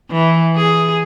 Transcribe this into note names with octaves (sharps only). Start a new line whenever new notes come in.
E3
G#4